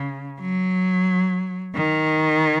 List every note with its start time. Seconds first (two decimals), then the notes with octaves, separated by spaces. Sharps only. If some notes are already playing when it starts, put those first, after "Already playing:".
Already playing: C#3
0.40 F#3
1.75 D#3